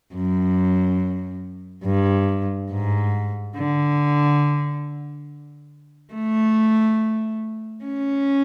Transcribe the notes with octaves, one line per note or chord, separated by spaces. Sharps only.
F#2
G2
G#2
D3
A3
C#4